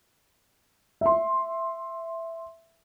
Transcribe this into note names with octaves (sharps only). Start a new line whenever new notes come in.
E5 C6